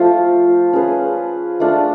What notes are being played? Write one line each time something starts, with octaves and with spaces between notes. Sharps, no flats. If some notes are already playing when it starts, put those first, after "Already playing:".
Already playing: F3 A3 F4
C#4 G#4 B4
A3 D4 F4